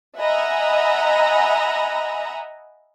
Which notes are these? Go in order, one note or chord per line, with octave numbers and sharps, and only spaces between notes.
D#5 E5 F#5 G#5 A#5 B5